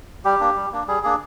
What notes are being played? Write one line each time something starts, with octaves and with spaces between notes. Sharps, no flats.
G3 G4
A#3 D4
G3
A#3 D4
G3 G#4
A#3 D4 G#4